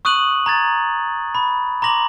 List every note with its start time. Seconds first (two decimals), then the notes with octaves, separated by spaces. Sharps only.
0.05 C#6 D#6 F#6 D#7 F#7
0.46 A#5 G#6 A6
1.35 B5
1.82 A#5 C6 D6 A#6 F#7